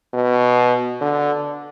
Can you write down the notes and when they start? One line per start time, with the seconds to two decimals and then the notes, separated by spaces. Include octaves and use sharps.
0.14 B2
1.01 D3